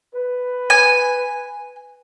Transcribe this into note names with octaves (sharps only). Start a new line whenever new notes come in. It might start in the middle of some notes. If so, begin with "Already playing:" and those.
B4
G#5